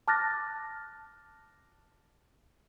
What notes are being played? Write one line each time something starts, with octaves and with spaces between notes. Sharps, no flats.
A5 D6 F6 F#6 A6 A#6